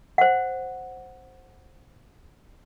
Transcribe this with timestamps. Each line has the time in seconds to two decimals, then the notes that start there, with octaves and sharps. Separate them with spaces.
0.18 C5 F#5